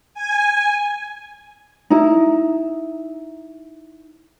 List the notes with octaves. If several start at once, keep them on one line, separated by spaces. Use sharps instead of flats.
G#5
D#4 E4